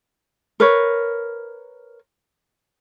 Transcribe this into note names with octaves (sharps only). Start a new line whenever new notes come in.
A#4 B4 C#5